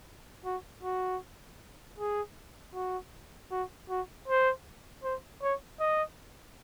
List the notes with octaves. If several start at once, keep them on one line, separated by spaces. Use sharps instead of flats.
F#4
F#4
G#4
F#4
F#4
F#4
C5
C5
C#5
D#5